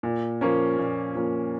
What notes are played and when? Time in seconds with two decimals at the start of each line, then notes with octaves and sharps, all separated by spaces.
0.03 A#2
0.41 F3 A#3 C#4
0.78 A#2
1.15 F3 A#3 C#4